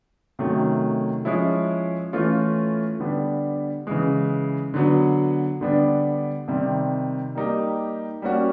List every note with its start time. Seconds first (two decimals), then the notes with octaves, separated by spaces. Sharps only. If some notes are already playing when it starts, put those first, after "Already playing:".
0.39 C3 D#3 F#3 A3 C#4
1.25 F3 G#3 C#4 E4
2.13 E3 A3 C#4 F4
3.00 D3 G3 B3 D4
3.87 C#3 E3 G#3
4.74 D3 F#3 B3
5.61 D3 G3 B3 D4
6.48 C3 D#3 G3 C4
7.35 G3 A#3 D#4 G4
8.22 G3 A#3 C#4 F#4